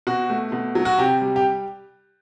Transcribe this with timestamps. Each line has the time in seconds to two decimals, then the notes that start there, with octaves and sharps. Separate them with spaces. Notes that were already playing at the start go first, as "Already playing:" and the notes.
0.07 B2 F#4
0.30 A3
0.52 B2
0.75 F#3
0.85 F#4
0.98 C3 G4
1.21 G3
1.36 G4